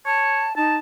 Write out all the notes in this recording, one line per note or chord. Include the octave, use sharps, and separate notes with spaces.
C#5 A5
D#4 A5